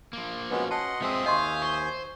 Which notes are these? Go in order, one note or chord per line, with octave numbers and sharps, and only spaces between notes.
F3 A#3
G#3 B3 C#4 F#4 B4
D#5 F#5 A5 C6
F3 G#3 C4 G#4 E5 D#6
D#2 D#5 F5 G#5 C6 C#6 G6
C5 C#6